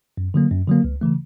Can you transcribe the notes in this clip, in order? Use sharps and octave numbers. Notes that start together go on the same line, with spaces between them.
F#2
D3 F#3 A#3
F#2
D3 F#3 A#3
C#2
C#3 E3 A3